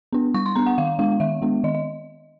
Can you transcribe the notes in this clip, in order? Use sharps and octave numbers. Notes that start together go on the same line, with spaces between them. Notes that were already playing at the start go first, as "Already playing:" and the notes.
B3 D4
G3 C#6
C6
B3 D4 A#5
F#5
D#3 F5
G#3 B3 D4 F5
D#3 E5
G#3 B3 D4
D#3 D#5
D#5